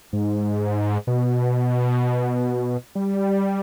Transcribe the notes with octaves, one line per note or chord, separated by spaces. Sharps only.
G#2
B2
G3